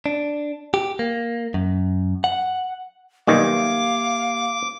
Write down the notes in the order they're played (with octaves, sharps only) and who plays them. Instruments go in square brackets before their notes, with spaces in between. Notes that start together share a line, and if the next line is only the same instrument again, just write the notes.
[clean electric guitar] D4
G4
A#3
F#2
F#5
[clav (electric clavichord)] B1 D#3 G3 [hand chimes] A#3 G4 G#6 [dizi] F5 [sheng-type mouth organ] D6